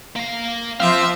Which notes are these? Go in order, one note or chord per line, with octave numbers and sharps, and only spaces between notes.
A#3 F5
F3 C4 E5 F5